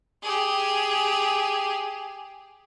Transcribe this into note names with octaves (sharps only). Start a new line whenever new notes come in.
G4 G#4